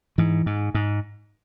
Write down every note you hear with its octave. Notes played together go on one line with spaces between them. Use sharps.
G#2 E3
G#2
G#2